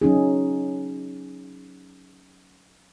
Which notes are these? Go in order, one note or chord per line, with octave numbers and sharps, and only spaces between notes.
F#3 C#4 D#4 G#4